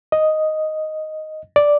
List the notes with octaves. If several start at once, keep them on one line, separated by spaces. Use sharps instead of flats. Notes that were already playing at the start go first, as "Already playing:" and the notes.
D#5
D5